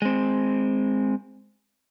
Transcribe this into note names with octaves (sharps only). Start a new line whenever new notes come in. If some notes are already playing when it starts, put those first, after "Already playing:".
G#3 C4